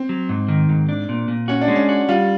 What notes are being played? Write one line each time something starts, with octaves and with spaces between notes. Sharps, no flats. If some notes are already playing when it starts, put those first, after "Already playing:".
Already playing: C4
F#3
G#2
D#3
G#2
D4
A#2
A#2
C#4 F#4
D4
G#3
C#4
F#4
G3 F4